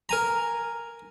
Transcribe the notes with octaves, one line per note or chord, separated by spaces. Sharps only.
A#4 G#5 A#5